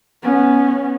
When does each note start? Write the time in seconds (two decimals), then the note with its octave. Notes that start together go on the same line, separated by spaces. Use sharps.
0.22 B3 C#4